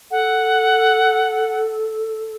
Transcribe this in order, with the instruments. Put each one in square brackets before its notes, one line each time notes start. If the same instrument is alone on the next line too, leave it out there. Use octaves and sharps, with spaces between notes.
[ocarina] A4 [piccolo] F#5